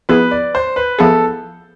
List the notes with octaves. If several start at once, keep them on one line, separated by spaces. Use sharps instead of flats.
F3 B3 E4 G#4 B4
D5
C5
B4
F3 B3 E4 G#4 A4